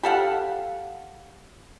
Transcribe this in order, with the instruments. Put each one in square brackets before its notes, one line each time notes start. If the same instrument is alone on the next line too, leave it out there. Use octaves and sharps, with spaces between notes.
[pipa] G4 A4 F5 F#5